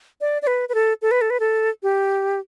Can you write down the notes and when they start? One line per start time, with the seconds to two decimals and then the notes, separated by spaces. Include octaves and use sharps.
0.21 D5
0.42 D5
0.47 B4
0.69 B4
0.75 A4
1.02 A4
1.11 B4
1.21 A4
1.30 B4
1.40 A4
1.83 G4